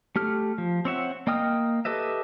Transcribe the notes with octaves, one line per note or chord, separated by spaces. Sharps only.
A3 G4 F6
F3
C4 C#5 E5 F#5
A#3 D#5 G5 D#6 F6
G4 A4 B4 D#5 E5